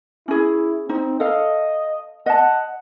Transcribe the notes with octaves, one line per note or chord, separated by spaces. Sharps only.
C#4 E4 G#4
C4 D#4
A4 D#5 F5
D#5 F#5 A5